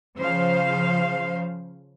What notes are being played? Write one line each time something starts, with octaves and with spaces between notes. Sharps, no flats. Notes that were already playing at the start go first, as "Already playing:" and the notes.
C#3 F3 C5 F5